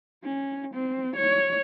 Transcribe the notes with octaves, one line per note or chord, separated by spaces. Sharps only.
C#4
C4
C#5